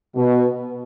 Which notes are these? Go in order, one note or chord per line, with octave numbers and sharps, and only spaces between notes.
B2